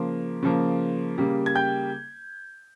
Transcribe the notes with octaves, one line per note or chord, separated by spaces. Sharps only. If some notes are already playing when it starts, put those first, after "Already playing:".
Already playing: C#3 F3 A#3 C6
C#3 F3 A#3
C#3 G3 A#3
G#6
G5 G6